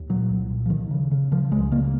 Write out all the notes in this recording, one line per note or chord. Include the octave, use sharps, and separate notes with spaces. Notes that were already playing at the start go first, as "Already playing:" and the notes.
Already playing: D#2
A#2 F#3
C2
A#2
F3
D#2 D#3
C#3
C#3
C#3 F3
C#2 G#3
C#3 A#3